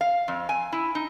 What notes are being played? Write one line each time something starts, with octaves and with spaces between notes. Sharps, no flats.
F5
F2
G#5
E4
D#4